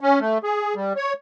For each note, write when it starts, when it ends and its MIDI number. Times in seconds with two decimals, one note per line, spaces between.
0.01 0.19 61
0.20 0.38 57
0.43 0.75 68
0.76 0.93 55
0.96 1.13 73